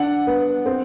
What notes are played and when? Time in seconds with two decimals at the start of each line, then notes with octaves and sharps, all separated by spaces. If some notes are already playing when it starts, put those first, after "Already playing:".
Already playing: D4 F#5
0.27 B3
0.66 C4